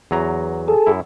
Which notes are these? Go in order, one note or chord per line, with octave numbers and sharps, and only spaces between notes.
E2 F#3 A#5
G#4 A4
F#2 E4